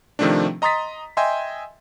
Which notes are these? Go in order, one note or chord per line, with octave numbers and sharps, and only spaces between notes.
C3 D#3 F3 A3 C4 D4
D#5 A#5 C6 D#6 A6 B6
D#5 E5 G5 G#5 C6